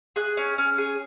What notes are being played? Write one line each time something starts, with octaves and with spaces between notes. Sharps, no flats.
G#4 F#6
C#4
C#4
G#4